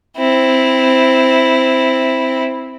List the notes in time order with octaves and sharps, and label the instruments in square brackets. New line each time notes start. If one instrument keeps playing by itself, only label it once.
[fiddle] C4 E4